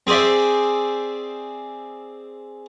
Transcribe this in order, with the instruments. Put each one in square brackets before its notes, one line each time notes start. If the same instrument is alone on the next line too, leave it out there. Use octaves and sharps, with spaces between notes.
[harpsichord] C4 G#4 C5 D5 E5